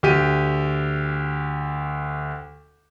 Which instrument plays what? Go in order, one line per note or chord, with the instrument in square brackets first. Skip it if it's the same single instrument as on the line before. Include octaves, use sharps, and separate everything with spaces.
[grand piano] D2 G4 D#7